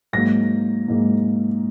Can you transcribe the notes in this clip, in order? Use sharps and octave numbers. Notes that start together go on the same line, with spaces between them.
G#2 F#3 A#3 A#6
G#2 F#3 A#3